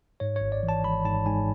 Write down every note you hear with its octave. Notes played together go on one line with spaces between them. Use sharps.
G#2 C#5
C#5
G#1
D5
E3
A5
G#1 B5
G#2 A5
G#2 G#5